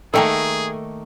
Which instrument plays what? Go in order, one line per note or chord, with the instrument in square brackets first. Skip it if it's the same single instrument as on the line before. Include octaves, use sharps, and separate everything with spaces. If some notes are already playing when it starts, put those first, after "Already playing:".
[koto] D#3 A3 A#3 [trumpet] G#4 [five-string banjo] A4 G5 G#5